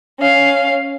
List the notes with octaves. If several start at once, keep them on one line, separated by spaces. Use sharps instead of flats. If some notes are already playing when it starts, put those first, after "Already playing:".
C#4 F5